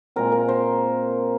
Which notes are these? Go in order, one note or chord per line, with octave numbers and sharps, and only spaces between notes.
A#2 G#3 C4 A#4
A#4
C5